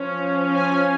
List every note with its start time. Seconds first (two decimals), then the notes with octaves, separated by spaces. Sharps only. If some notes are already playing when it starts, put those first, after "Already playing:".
Already playing: F3 C#4
0.55 G#5